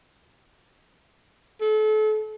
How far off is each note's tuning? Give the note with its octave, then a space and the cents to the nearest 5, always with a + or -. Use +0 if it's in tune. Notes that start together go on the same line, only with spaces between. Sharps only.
A4 -35